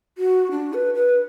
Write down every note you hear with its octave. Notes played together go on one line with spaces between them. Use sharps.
F#4
D4
B4
B4